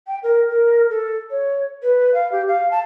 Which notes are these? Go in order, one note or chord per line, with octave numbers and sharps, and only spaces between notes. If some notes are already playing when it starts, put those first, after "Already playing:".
G5
A#4
A#4
A4
C#5
B4
F5
G4
F5
A5